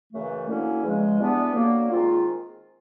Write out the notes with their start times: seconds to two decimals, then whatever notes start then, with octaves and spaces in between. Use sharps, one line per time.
0.12 F#2 C#3 E3 A3
0.48 D3 F#3 A#3 C#4 E4
0.83 E2 C#3 F3 G#3
1.19 E3 G3 B3 D4
1.54 D3 F#3 A#3
1.90 D#3 G#3 C4 F4